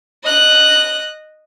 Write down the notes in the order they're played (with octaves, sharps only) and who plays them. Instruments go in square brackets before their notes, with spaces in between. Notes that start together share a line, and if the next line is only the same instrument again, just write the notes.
[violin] D#5 F#6